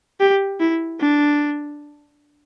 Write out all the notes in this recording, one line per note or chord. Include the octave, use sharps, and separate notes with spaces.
G4
E4
D4